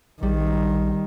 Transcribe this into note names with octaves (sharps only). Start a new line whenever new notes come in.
A#1 D#3 G3